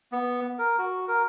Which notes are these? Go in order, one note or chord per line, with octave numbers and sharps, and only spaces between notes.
B3
A#4
F#4
A#4